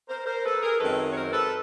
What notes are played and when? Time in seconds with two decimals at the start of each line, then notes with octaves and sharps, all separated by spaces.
0.09 A#4 C5
0.26 A#4 C5
0.44 A4 B4
0.62 G#4 A#4
0.79 F#2 D#3 G#3 C4 A4 B4
1.12 C#5
1.15 A#4 C5
1.32 A4 B4